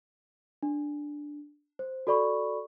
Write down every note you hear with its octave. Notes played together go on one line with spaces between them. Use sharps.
D4
C5
F#4 A4 D5 B5 C#6